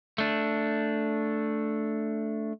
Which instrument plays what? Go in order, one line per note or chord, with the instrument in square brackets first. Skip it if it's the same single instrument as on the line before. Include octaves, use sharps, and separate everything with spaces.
[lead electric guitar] A3 D4